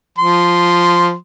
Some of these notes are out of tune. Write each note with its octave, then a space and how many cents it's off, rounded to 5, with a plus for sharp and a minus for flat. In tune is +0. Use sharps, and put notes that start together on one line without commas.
F3 +0 C6 -10